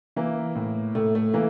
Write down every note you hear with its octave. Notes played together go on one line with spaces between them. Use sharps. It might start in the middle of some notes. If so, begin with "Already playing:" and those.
E3 A#3
A2
A2 A3
A3
E3 A#3